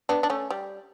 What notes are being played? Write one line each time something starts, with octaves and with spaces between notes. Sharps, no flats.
B3 D4
D4
A3 C#4
G3